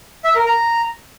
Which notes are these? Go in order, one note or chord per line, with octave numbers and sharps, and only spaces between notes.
E5
A#4
A#5